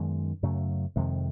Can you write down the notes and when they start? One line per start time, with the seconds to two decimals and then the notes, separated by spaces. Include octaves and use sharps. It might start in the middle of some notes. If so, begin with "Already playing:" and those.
Already playing: F#2 D#3 G#3 B3
0.42 F#2 C#3 F#3 A3
0.96 F2 C3 D#3 G#3